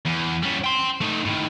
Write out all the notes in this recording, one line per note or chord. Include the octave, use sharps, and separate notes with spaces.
E2
G3 C#4
G5 C6
A3 D#4
A2 D#3